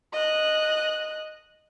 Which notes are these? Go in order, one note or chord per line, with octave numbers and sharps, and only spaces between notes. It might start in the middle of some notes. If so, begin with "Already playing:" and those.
D#5 F#6